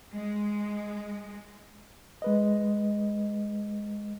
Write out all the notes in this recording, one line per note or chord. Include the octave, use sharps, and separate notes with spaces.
G#3
G#3 B4 D#5